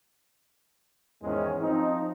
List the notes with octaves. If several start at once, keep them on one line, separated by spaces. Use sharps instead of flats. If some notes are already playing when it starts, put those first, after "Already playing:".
E2 G#2 D#3 G#3 C#4
F3 C4 D#4